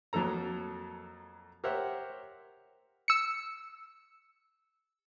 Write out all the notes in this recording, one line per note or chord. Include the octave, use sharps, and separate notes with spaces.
F2 F#3 A#3 A4 A#5
G4 A#4 C5 C#5 E5 F#5
E6 C#7